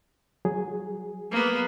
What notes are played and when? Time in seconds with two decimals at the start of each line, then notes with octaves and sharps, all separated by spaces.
0.45 F#3 G#4
1.32 A#3 B3